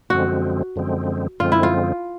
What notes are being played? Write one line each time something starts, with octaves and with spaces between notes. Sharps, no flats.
F#2 D3 F3 G#3 C4 F#4
F#2 D3 F3 G#3 C4
F#2 D3 F3 G#3 C4 F4
E4
F4